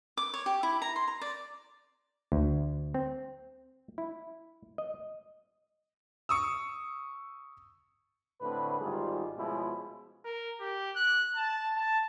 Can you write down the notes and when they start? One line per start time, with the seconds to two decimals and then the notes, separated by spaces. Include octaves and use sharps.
0.17 D6
0.34 C#5
0.46 G4
0.63 E4
0.82 A#5
0.96 C6
1.08 A#5
1.21 D5
2.32 D2
2.94 C4
3.98 E4
4.78 D#5
6.29 C#6 D#6 E6
8.41 A2 D3 A3 C4 B4
8.80 G#1 G#2 G3 F4 G#4
9.37 B2 F3 G#3 A3 C#4 E4
10.25 A#4
10.60 G4
10.96 F#6
11.35 A5
11.76 A5